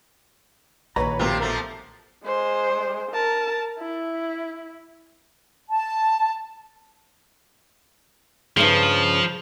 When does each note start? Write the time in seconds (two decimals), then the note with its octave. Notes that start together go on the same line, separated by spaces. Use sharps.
0.96 A#1 D#2 A#2 B4 C#5 A#5 B5
1.19 B1 C3 C4 F4 A#4
1.40 F3 A3 A#3
2.25 G#3 C5
3.12 A#4 A5
3.79 E4
5.70 A5
8.57 G2 A#2 C#3 F3